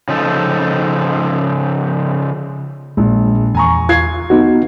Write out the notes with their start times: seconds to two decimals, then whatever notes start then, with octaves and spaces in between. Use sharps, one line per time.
0.09 C#3 F3 D#4 A4
2.97 A#1 G#3
3.55 E2 G#5 A#5 C#6
3.89 F4 G#6 C7
4.30 B3 D#4 F#4